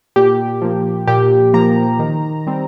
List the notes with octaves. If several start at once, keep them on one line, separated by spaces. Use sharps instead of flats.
A#2 G4
F3 A#3
A#2 G4
F3 A#3 A#5
D#3
G3 C4